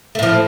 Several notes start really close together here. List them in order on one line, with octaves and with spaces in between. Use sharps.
A3 A2 F3